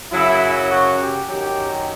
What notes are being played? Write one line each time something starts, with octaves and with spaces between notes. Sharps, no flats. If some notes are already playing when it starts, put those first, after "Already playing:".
F#2 C#3 F#3 E4
F#4
G4
F#2 D#3 F#3 G4